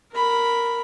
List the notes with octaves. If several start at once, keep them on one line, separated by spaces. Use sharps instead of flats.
A#4 B5